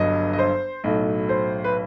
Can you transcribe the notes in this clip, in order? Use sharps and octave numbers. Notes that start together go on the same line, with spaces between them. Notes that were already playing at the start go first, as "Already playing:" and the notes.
Already playing: G1 G2 F#3 D#5
D#5
C5
B1 A2 F#3 A3 D#5
C5
B4